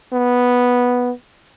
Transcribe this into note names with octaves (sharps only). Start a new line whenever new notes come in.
B3